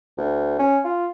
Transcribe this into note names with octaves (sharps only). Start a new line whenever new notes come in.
D2
C#4
F4